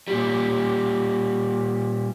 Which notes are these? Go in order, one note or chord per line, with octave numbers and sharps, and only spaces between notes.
A#2 G3